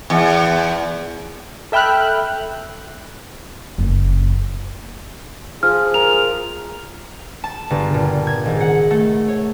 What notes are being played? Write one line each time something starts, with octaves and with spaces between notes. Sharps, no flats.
E2
A4 E5 G5 B5 F6 F#6
F#1 C#4
F3 G#4 F6
A#4 F7
A5
G1
A#2
G#6
G#1
F#5
A3
C#5